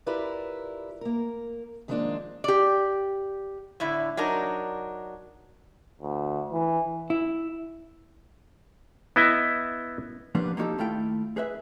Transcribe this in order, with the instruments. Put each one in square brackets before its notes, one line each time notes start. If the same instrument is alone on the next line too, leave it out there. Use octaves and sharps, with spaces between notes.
[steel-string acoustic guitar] E4 F4 G4 A#4 B4 D5
A#3 A#4
D#3 F3 G#3 A#3 D4 F4
[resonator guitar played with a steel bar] G4 D5
A2 D3 E4
F#3 D4 D#4 A#4
[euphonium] D2
E3
[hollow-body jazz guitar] E4
[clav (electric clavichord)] B3 E4 D#5 E5
[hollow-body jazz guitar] F3 G3 A#3 B3 D4
A#3 B3 D#4 F#4 G4 A4
D#2 A3 E4 F4 A4 G5
G#4 B4 E5